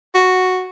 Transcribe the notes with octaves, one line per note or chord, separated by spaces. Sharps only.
F#4